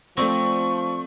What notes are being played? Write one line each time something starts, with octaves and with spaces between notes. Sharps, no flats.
F3 A3 C4 D5 C#6 A#6